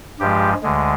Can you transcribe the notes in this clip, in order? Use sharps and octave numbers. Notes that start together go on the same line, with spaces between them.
G2 F3 G#3 G4
D2 D3 G#3